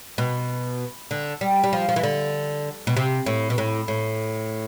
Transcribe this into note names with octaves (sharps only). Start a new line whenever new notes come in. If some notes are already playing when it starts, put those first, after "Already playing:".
B2
D3
G3
G3
F3
F3
E3
D3
B2
C3
A2
B2
A2
A2